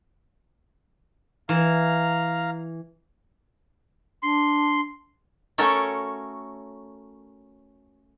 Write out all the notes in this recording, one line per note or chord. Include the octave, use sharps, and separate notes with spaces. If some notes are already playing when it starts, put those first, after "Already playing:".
E3 F5 A#5
D4 C6
A3 C#4 F#4 A4 A#4 C#5